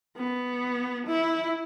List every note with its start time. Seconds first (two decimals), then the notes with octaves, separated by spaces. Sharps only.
0.17 B3
1.07 E4